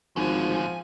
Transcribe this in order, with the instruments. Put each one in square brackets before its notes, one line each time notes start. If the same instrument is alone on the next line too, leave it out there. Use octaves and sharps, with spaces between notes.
[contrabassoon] G#1 [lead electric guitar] A2 D3 [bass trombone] F3 [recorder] G#5